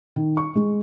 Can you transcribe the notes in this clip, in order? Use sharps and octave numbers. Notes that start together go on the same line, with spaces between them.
D#3
C#6
G#3